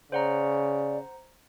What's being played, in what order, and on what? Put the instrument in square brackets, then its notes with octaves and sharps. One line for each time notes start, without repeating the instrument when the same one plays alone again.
[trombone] C#3 [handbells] C5 F#5 A#5 [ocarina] D5